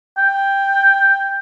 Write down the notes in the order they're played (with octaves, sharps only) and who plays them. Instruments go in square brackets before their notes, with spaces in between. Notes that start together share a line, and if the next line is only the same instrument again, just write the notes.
[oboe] G5